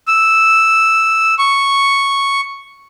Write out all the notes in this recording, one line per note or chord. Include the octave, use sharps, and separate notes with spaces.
E6
C#6